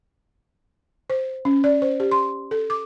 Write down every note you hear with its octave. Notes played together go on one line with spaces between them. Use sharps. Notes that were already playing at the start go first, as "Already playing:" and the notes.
C5
C#4
D5
C5
G4
C6
A4
D6